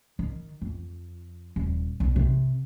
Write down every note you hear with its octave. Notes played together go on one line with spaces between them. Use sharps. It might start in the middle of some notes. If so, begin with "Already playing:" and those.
D#3
F2
D#1
B1
C3